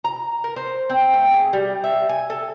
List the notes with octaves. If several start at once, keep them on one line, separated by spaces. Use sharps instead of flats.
A#5
A#4
C5
C4
A3
G#4
G3
E5
G#5
A4